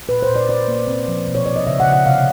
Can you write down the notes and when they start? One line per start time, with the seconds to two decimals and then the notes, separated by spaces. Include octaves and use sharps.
0.09 A#2 B4
0.23 C5
0.30 A#2
0.36 D5
0.49 C#4 D5
0.68 A#3
0.88 C4
1.08 F3
1.28 B2
1.35 C#5
1.46 B2 D5
1.56 D#5
1.67 C#3 E5
1.80 F#5
1.86 C#3
1.92 F#5
2.06 C3 F5